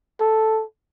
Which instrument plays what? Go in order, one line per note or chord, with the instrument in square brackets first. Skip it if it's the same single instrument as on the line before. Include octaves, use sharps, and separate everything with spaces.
[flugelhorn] A4